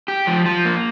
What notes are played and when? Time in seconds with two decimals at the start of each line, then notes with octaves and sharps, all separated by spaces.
0.08 G4
0.27 F3
0.46 F3
0.65 A#3